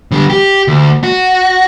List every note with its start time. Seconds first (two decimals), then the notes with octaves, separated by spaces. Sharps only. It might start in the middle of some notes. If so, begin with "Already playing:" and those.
0.11 D3 G3
0.30 G4
0.68 D2
1.03 F#4